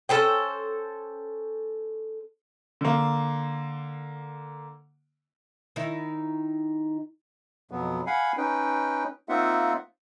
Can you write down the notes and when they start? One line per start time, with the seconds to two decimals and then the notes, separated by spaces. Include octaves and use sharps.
0.09 C#4 A4 C5 G5
2.81 D3 A#3
5.76 D#3 D#4 E4
7.71 F2 B2 F#3 B3
8.07 F5 F#5 G#5 B5
8.37 C#4 D#4 B4 G5
9.29 A#3 C4 D#4 F4 E5 F#5